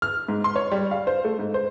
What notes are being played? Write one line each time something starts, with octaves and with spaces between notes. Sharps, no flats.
F6
G#2
C6
C#5
G3
F5
C5
A3
G#2
C5